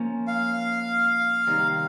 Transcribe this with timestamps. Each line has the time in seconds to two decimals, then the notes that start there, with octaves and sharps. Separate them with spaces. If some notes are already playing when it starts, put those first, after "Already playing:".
Already playing: F3 A#3 C#4
0.27 F5
1.47 C3 D#3 G3 C4 D#4